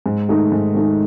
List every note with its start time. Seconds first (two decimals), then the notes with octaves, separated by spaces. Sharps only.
0.06 G#2
0.29 D#3 A3 D#4
0.52 G#2
0.74 D#3 A3 D#4